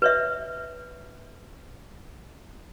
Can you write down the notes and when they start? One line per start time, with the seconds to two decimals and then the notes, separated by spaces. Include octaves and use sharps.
0.02 B4 C#5 E5